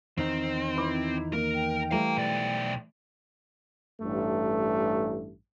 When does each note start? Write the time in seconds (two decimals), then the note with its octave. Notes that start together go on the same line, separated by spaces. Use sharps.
0.18 E2 D#3 C4 D#4
0.76 E4 B4 D6
1.33 A#3 A#4
1.55 G5
1.91 E3 G3 A3 F5 A#5
2.18 B1 D5
4.02 A1 G2 A3